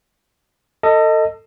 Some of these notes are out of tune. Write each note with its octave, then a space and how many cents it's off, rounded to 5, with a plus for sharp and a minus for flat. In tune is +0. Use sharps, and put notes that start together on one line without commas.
A4 +30 D#5 +5